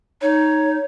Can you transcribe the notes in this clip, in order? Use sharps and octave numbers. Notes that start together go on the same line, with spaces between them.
D#4 C#5